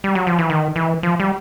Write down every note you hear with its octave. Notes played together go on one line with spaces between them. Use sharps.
G3
F#3
F3
E3
D#3
E3
F3
G3